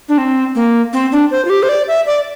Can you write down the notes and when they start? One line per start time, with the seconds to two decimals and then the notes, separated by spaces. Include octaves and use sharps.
0.09 D4
0.18 C4
0.55 A#3
0.93 C4
1.12 D4
1.31 C5
1.45 F4
1.50 G4
1.63 C5
1.69 D5
1.88 E5
2.06 D5